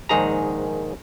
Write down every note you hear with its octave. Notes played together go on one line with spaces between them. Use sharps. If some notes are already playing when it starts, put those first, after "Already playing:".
A#1 G#2 D#3 G#4 A#5